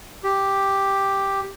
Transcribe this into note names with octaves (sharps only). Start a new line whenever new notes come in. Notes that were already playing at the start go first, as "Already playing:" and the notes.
G4